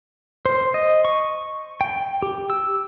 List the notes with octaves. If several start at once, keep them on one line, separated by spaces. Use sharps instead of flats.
C5
D#5
C#6
G5
G4
E6